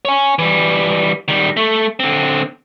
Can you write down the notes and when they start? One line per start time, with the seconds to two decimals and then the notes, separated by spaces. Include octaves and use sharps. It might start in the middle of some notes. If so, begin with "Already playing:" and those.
0.05 C#5 G#5
0.39 E3 G3
1.28 D#3 G3
1.57 A3
2.00 D3 C4